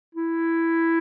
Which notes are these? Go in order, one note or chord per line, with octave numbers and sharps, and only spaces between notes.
E4